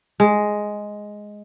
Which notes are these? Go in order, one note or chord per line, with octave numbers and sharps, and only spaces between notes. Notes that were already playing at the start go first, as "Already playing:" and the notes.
G#3